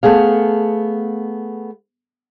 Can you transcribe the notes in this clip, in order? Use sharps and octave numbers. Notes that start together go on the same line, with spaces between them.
A3 B3 G#4 F5